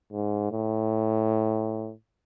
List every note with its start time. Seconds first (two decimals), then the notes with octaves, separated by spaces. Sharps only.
0.12 G#2
0.51 A2